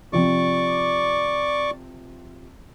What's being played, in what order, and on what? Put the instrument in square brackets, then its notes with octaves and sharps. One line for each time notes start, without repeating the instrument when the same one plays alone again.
[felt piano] C3 F3 C4 [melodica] D5 C#6 D6